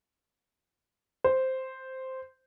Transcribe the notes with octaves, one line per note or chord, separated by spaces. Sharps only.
C5